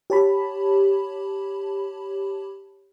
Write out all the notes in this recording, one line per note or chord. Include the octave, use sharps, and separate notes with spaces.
G4 C#5 A5 B5